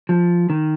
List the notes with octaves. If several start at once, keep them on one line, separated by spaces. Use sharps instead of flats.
F3
D#3